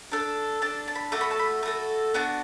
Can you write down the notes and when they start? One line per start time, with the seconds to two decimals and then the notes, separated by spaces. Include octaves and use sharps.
0.12 D4 A4
0.62 D4 A4 A5
0.88 A5
0.95 B5
1.12 A3 F#4 A4 D6
1.21 B5
1.31 A5
1.39 B5
1.63 A3 F#4 A4
2.14 B3 D4 F#4